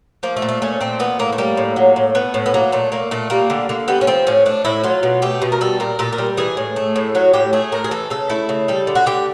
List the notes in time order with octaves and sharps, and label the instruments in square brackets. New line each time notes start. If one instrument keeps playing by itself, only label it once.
[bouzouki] F3 A#3
A3
A#2
A3
A3 C#4
A#2 C4
E3 B3
A2 A#3
A3
G3 A#3
A2
F#3
A2
A3 B3
A2
B3
F#3 A#3
A#2 A3
A3 A#3
A#2 A3
G3 A#3
D3
D3 A#3
G3 B3
C#4
F3 C4
A2 C#4
A3 D4
A2 E4
F#3 F4
B2
A3 G4
B2
A#4
G3 A4
A#2 A#4
A#2 A4
A#4
G3
E3 G#4
A2
A3
A2
F#3 F#4
A2 G4
A3 G#4
A2 A#4
G#4
E3 A4
C#3 A4
A3 E4
C#3
G3 A4
D3
F#4
D3 G4